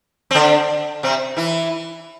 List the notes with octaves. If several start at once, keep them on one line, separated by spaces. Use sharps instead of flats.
C4
D3 D4
C3 C4
E3 E4